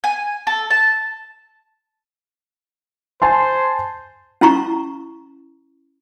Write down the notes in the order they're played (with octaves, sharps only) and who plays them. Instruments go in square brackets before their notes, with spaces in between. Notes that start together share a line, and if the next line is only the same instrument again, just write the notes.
[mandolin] G#5
A4
A5
[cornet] C5 [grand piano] G#5 A5 C6
[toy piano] C#4 E4 A#5 C#6